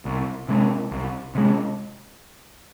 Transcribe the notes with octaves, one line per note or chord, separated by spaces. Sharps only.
C2
C3 G#3
C2
C3 G#3